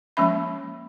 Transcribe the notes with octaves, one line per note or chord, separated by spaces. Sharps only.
F3 G#3 A#3 C#4 E5 B5